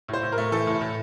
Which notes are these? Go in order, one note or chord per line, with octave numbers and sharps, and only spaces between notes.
A2 C5
A2
A#4
A3
E3 A4
A2
A2